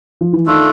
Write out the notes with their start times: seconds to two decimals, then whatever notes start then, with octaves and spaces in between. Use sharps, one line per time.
0.21 F3
0.33 E3
0.46 D#3 A3 D4 F4 A4